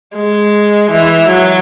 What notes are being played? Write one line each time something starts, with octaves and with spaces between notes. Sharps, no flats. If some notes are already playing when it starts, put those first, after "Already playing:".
G#3
E3
F#3